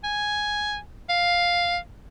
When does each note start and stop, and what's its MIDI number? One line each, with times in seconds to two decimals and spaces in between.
0.04 0.77 80
1.09 1.78 77